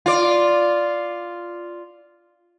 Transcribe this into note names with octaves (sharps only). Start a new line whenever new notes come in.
F4 D5